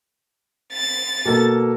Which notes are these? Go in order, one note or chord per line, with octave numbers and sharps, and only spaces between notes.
A6
B2 A#3 A4